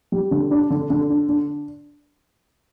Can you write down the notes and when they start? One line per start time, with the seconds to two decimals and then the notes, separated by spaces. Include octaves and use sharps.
0.12 G3
0.31 D3
0.51 D4
0.70 D3
0.90 D3
1.10 D4
1.29 D4